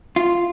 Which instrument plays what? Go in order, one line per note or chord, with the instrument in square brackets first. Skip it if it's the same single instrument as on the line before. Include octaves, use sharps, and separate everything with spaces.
[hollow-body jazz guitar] F4